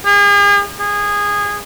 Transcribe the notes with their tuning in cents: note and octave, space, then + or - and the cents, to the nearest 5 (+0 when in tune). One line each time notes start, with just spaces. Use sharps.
G#4 -40
G#4 -20